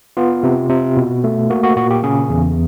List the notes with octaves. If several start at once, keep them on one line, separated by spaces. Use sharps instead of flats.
B3 F4
C3
C3
B2
A3
A#3 F#4
F#4
A#2 F#4
G4
C#3 G#4
E2